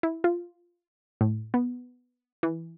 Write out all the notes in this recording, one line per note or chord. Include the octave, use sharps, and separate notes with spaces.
E4
F4
A2
B3
E3